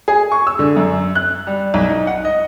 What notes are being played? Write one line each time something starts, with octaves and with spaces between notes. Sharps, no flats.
G#4
C#6
E6
D3
F#2
F#6
G3
B1
D#4
F#5
D#5